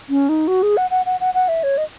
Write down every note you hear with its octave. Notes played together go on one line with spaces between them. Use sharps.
C#4
D#4
F#4
G#4
F#5
F#5
F#5
F#5
F#5
E5
C#5
D#5